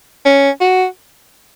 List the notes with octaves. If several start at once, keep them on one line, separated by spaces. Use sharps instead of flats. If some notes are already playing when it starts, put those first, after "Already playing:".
C#4
F#4